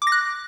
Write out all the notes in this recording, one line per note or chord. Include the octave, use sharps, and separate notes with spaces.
D6
A#6
F#6